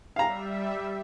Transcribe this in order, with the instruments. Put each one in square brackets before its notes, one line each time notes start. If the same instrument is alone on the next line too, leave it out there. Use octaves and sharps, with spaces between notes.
[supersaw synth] G3 E5 [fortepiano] F5 A#5